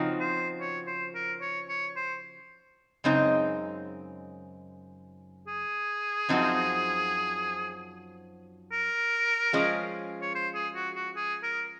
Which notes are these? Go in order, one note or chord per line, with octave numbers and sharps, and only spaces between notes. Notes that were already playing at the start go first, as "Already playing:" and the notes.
Already playing: C#3 F3 C4 D#4 F#4
C5
C#5
C5
A#4
C#5
C#5
C5
F#2 C#3 G#3 C4 D#4
G#4
F#2 F3 C4 D#4 F#4
A#4
F3 G#3 C#4 F4
C#5
C5
G#4
F#4
F#4
G#4
A#4